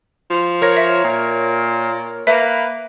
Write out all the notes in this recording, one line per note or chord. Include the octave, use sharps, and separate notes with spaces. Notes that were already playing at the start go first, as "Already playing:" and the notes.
F3
A#4 C#5 A#6
E5
A#2
A#3 B4 E5